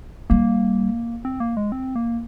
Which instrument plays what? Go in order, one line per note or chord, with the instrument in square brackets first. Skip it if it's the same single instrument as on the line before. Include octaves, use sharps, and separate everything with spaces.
[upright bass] G3 [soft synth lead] A#3
[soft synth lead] C4
A#3
G#3
C4
A#3